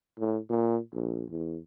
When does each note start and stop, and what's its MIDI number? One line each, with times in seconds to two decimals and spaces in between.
0.19 0.38 45
0.49 0.78 46
0.93 1.24 34
1.30 1.59 40